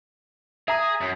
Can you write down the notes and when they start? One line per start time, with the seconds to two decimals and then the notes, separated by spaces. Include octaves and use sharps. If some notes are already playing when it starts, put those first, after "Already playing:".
0.68 G#4 E5 A#5 D#6
1.01 F#2